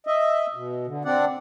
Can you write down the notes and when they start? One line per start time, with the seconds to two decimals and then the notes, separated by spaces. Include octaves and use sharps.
0.07 D#5 E5
0.54 B2
0.87 D3
1.05 C4 D4 D5 F#5